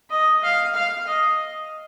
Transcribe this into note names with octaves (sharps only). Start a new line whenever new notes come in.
D#5
F5
F5
D#5